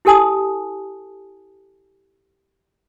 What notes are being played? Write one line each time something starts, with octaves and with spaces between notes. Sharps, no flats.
E4 G4 A4 G#5 A5 D#6